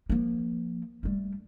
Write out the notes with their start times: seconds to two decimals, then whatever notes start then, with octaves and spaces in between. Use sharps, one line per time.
0.09 F3 A#3
1.03 G3 A3